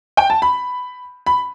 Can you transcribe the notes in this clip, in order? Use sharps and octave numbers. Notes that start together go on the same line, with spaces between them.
G5
A5
B5
B5